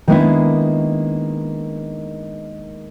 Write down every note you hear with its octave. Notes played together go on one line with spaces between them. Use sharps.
D#3 G#3 A#3 B3 D4 E4